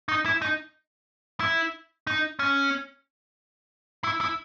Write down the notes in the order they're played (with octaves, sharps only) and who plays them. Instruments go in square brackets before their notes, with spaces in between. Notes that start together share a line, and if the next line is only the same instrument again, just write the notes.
[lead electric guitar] D#4
E4
D#4
E4
D#4
C#4
E4
E4